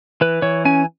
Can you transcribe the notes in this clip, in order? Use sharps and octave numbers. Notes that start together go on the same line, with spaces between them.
E3 B4
E3 C#5
C#4 G#5